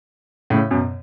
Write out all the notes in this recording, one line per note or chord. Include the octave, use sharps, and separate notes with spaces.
A2 C#3
F#2 B2